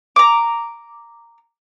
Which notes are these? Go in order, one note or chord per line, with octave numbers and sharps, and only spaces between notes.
A#5 D6